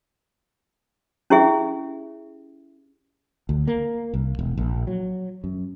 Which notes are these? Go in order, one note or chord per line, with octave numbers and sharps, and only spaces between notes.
C#4 E4 G4 G#4 E5
D2
A#3
C2
E1
A#1
F#3
F#2